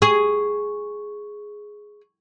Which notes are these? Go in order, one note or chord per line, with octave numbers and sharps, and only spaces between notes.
G#4 C#6